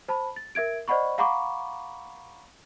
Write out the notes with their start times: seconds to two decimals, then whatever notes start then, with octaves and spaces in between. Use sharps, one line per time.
0.08 C5 A5 B5
0.36 A6
0.55 A#4 E5 G#6 D7
0.88 C5 D5 D#5 F#5 B5 C#6
1.18 F5 F#5 A#5 B5 C#6 D6